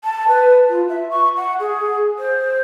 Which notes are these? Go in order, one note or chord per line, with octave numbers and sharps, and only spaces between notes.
A5
B4
F4
E5
C#6
F#5
G#4
C5